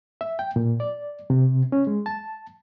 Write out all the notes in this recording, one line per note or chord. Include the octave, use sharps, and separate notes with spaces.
E5
G5
A#2
D5
C3
C#4
G#3
A5